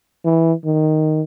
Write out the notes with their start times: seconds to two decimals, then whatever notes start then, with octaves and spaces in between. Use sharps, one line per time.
0.25 E3
0.65 D#3